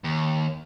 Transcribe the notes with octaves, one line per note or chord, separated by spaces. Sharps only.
D#2